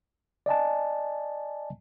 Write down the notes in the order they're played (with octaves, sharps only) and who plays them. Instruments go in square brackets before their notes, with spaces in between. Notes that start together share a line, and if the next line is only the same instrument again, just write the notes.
[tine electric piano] D5 D#5 G#5 A5